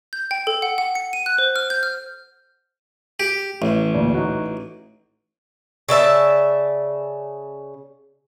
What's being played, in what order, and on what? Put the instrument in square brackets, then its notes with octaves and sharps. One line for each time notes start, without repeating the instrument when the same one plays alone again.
[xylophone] G6
G5
A4
F#5
F#5
C#7
D#7
F#6
C5
F6
G6
F6
[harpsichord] G4
A1
[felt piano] D2 A#2 D3
D#4 F#4
[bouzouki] C#3 D5 E5 A5